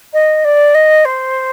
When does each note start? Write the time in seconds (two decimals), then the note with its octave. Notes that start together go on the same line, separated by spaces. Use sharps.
0.13 D#5
0.44 D5
0.74 D#5
1.05 C5